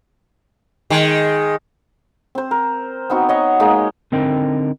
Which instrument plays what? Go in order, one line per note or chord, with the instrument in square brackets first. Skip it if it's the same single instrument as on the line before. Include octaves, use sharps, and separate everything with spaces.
[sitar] D#3 G#3
[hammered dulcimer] C4 C5
A#4
B3 C4 D#4 F#4
C#5 D#5 F#5
G#3 A#3 D#4
[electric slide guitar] D3 C4 D#4 A#4 G5